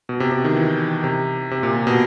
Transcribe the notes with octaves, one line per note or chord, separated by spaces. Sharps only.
B2
C3
C3
D#3
E3
C3
C3
A#2
C3
B2